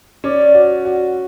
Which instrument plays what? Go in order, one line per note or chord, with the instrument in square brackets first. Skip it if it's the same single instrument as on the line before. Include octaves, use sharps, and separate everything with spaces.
[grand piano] C#4 [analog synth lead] D5
[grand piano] F#4
F#4